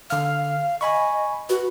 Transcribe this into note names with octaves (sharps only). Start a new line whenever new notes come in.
D3 F5 F6
D#5 G#5 B5 C#6
F#4 B4